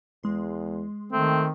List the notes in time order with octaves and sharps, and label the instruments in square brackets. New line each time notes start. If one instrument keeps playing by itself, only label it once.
[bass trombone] E2 [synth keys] G#3 C6
[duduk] D#3 [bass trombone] A3 [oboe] C4